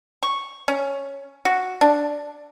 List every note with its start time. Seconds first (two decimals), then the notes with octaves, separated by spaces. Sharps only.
0.23 C#6
0.68 C#4
1.45 F#4
1.81 D4